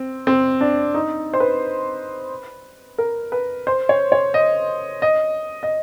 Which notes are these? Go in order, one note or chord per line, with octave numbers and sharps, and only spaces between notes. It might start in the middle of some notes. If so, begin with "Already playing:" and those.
Already playing: C4
C4
D4
D#4
C5
B4
A#4
B4
C5
C#5
C#5
D#5
D#5
D#5